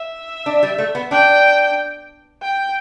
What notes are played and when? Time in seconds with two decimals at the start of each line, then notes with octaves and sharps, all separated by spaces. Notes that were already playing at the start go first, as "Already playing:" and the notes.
Already playing: E5
0.46 D4
0.63 G3
0.78 A3
0.95 B3
1.11 D4 G5
2.42 G5